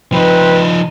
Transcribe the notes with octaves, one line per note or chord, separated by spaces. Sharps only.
F3 C4 D#4 B4